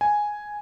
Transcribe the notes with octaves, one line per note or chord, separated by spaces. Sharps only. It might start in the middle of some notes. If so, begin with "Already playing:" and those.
G#5